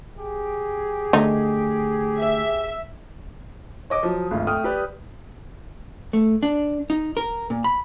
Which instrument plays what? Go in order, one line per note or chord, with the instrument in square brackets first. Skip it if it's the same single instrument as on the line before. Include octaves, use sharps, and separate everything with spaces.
[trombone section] G4 G#4
[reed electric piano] D3 A3 [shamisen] D#4
[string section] E5
[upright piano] C#5 D#5 D6 D#6
F3 F#3
G#1 D2 F4
A3 G5 D#6 F6
G4 B4 D5
[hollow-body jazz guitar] A3
D4
D#4
A#4
A#2
B5